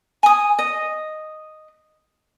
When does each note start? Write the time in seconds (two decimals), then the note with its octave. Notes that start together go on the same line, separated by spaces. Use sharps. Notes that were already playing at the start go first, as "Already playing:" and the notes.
0.23 G#5 D#6
0.59 D#5